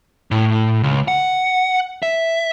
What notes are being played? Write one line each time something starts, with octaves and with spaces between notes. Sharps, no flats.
A2
C#2
F#5
E5